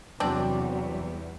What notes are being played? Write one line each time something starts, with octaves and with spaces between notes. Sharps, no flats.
E2 C3 F#3 G3 C4 D4 D5